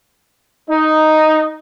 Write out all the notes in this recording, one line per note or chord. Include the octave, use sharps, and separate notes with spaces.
D#4